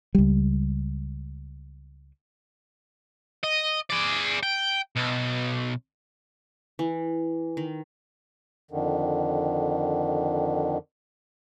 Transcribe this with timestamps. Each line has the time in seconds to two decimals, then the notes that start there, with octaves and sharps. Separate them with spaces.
0.15 C#2 G3
3.43 D#5
3.90 G#4 D5
4.43 G5
4.96 B1
6.79 E3
7.57 D#3
8.71 F2 D3 D#3